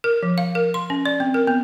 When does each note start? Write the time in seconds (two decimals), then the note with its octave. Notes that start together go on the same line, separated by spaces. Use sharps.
0.04 A#4
0.23 F3
0.38 F5
0.55 A#4
0.74 C6
0.90 C#4
1.06 D5
1.20 C4
1.34 A#4
1.47 B3